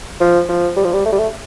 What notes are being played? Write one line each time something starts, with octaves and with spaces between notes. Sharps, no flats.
F3
F3
G3
F3
G3
A3
G3
A3